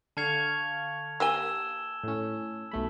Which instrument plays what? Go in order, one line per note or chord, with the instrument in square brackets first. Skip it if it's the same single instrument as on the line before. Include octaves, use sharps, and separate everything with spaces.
[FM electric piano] D3 F5 C#6 [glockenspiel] A5 G#6 F7
[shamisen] A#3 G4 G#5 [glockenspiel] E6 E7 G7
[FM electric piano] A2 C#4
B1 A3 B5